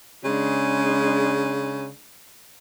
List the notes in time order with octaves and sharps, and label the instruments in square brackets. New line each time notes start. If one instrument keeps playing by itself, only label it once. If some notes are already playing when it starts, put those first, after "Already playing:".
[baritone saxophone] C#3 [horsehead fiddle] G#3 D4